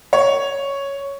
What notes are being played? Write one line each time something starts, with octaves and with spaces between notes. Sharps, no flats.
C#5